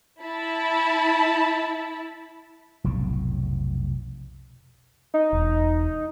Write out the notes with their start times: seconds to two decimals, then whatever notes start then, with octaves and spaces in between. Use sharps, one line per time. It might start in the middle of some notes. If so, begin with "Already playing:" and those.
0.22 E4 A5 B5
2.84 F1 B1 A2 C#3
5.14 D#4
5.33 E1